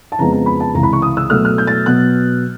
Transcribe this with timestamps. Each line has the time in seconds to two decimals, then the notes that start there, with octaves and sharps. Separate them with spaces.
0.12 A5
0.18 F2 C#3 F3 G#3 B3 A#5
0.32 A#5
0.46 B5
0.60 A5
0.74 C#2 C3 E3 A#5
0.83 B5
0.93 C#6
1.02 D#6
1.17 E6
1.30 B2 F#3 A3 F6
1.45 F6
1.58 G6
1.67 A6
1.86 B2 F#3 B3 F#6